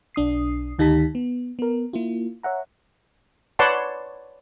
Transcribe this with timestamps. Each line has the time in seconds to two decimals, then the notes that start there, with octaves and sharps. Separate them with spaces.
0.15 B1 D4 D#6 C7
0.79 D2 D#3 D#4 G4 A5 B6
1.15 B3
1.59 B3 A#4
1.93 A#3 E4 F4
2.43 C#5 E5 F#5 A#5
3.59 B4 C#5 D5 F#5 A5 C6